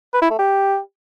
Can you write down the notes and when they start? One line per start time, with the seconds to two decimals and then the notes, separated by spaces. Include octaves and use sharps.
0.14 B4
0.22 E4
0.30 A3
0.39 G4